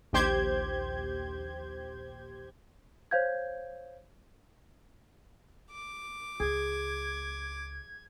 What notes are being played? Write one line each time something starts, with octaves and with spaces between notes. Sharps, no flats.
A#1 D#2 G4 C5 G6 G#6
C5 C#5 F5 G6 G#6
D6
C#2 G#4 G#6